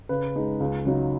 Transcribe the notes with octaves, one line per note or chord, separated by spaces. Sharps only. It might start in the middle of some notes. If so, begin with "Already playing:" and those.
C#3 B4
G#3 D#4
C#2
C#3 F#3 D#4